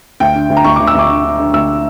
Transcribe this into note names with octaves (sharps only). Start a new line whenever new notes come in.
D2 G5
D3
D2
A#5
D2 C#6
D6
D2
E6
D2 D6
D3
D3
D3
D2 E6